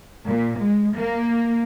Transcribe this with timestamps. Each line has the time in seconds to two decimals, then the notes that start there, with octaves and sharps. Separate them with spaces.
0.27 A#2
0.59 G#3
0.96 A#3